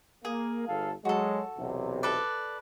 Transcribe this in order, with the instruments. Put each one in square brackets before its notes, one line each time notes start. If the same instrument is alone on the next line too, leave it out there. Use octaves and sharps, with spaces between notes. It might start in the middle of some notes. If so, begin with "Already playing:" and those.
[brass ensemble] A#3 [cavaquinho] G#4
[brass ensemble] G1 A4 F5
[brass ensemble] F#3 G#3 [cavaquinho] F#4 A4
[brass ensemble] B1 E2 C3
[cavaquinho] A4 B4 D5